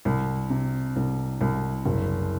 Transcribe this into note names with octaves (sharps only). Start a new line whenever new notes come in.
C2
C3
C2
C2
F#1